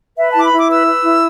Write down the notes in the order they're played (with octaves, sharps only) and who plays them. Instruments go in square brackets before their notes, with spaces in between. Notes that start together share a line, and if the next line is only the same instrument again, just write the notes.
[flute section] B4 E5
A5
E4 D6
B5
E4 D6
B4 E6
B4
E4